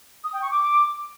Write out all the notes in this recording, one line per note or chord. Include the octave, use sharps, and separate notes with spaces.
D#6
G5
C#6
D6